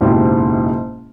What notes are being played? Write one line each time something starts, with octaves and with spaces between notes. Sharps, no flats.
F#1 G#2 B2 E4 G4